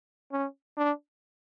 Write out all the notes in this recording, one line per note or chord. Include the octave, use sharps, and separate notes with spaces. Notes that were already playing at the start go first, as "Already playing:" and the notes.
C#4
D4